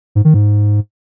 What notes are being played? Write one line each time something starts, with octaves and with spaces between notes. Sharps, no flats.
G#2
D#3
G#2